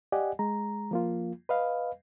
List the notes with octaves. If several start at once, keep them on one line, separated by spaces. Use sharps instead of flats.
G4 D5 D#5 F#5 G#5
G#3 A#5
F3 A#3 F4
B4 D#5 F5